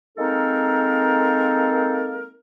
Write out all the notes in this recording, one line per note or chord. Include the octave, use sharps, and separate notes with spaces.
G#3 A#3 C4 D#4 A4 A#4